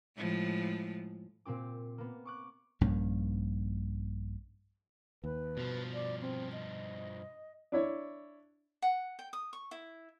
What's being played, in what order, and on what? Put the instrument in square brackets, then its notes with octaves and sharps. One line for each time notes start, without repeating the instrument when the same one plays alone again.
[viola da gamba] A2 F3 G#3
[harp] A#2 C4 G4 D6
A#3 B3
C#6 D6 F#6
[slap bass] A#1 G2 A#3 C#4
[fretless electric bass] D#2 [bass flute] B4
[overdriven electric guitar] G2 F3 [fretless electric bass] B2
[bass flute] D5
C4
D#5
[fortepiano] D4 E4 C#5
[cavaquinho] F#5
G5
D#6
C#6
E4